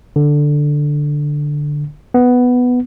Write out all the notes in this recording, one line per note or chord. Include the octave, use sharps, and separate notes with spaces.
D3
B3